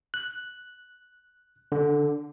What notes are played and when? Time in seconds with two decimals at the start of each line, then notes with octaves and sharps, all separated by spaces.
0.14 F#6
1.72 D3